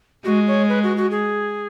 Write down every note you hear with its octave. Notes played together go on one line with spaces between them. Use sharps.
G#3 F#4
C#5
B4
F#4
F#4
G#4